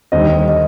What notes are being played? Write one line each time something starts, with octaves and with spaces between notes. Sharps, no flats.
D#2 D3 G3 C5 D#5
D#5